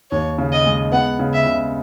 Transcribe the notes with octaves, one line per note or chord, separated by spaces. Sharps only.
D#2 C#5
C#3
D#5
G#3
B3 F#5
C#3
E5
C#3